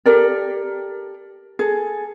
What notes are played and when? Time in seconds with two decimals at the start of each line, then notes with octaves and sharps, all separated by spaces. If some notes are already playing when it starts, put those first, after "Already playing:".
0.06 G4 A4 A#4 D5
1.59 G#4 A4